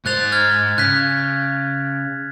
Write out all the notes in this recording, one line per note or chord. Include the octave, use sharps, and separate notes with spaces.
G#2 C5 F#6 A6 F7
F6 G#6
C#3 F#6 B6